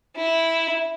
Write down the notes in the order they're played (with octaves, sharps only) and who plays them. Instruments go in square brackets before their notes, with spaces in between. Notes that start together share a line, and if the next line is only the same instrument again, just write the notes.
[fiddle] E4